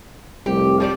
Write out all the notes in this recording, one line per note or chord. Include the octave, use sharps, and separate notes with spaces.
F1 C2 G4
F3 G3 D5